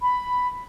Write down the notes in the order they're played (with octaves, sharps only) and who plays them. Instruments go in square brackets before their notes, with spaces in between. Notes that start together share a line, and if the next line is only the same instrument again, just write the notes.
[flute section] B5